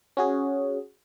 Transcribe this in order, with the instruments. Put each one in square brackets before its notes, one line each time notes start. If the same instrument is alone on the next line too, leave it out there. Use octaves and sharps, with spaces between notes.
[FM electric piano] C#4 F#4 G#4